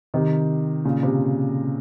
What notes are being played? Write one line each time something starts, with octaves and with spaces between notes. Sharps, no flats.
C3 D#3
A#2 C#3
C3